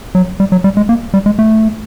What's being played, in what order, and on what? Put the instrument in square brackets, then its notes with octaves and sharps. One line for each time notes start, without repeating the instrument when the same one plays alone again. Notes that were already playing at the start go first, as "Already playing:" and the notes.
[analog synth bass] F#3
G3
F#3
G3
G#3
A#3
G3
G#3
A3